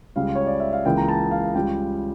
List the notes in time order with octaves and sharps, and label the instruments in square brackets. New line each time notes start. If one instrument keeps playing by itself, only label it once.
[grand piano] C#2 C#3 G3 F5
C#5
D5
E5
F5
C#2 C#3 E3 A#3 G5
A#5
A5
F5
C#2 C#3 G3 G5